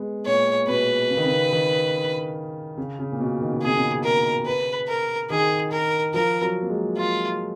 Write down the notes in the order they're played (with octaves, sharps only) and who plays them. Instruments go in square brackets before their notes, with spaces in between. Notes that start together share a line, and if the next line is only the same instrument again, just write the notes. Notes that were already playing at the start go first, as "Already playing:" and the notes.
Already playing: [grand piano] G#3 B3
[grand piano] A#2 [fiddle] C#5
[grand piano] B2 [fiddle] B4
[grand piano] C#3
D#3
C#3
D#3
C#3
C#3
A#2
B2
D#3
C#3
[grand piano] B2 [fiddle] G#4
[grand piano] C#3
[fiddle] A#4
B4
A#4
[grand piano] D#3 [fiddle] G#4
[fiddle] A#4
[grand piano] F3 [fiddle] A#4
[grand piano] F#3
A#3
G#3
[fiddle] F4